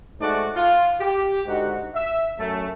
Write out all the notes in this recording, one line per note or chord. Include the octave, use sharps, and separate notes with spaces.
G#2 G#3 A3 D#4 F#4 D5
F4
G4
G#2 D3 D#4 F#4
E5
F#2 A3